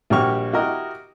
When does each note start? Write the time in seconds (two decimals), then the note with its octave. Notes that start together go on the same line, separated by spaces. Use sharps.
0.10 A#1 G3 F#4 G4 C#6 F6
0.53 E4 F#4 G4 A#4 D#5